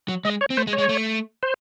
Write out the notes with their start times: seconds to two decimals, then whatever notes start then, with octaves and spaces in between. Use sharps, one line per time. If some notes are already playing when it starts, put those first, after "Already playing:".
0.08 F#3
0.25 G#3 D#5
0.41 C#5
0.50 C4
0.57 A3 C5
0.67 G#3
0.73 C#5
0.78 G#3
0.89 A3
1.43 C5